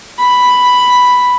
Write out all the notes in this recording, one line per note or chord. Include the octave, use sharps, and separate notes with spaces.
B5